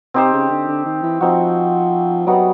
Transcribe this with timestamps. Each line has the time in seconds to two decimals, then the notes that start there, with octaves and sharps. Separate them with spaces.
0.14 C3 C4 D#4 G4 C5
0.33 C#3
0.50 D3
0.68 D3
0.85 D#3
1.03 E3
1.20 F3 C4 D#4 F#4
2.26 F#3 G3 B3 D#4 F#4